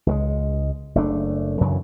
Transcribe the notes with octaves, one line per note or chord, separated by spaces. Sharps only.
C#2 F#3 G#3
F#1 A3 D4
F#2 C#3 E3 F#3